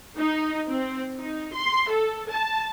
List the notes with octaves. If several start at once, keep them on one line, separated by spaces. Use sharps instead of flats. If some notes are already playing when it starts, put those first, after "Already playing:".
D#4
C4
D#4
C6
A4
A5